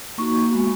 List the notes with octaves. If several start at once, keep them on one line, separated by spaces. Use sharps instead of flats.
A#3 D#4 F#4 C#6
G#3 B3 F#4